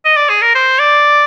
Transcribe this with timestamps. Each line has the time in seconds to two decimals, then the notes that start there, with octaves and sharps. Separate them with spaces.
0.05 D#5
0.16 D5
0.30 G#4
0.42 A#4
0.55 C5
0.79 D5